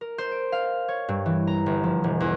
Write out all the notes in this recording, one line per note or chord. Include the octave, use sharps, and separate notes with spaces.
A#4
C5
D7
F5
C#5
G2
E3
A#5
G1
F3
E1
E2